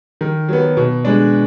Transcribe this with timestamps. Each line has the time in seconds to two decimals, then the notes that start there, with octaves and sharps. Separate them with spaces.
0.21 D#3
0.49 F#3 B3
0.77 B2
1.05 G#3 D4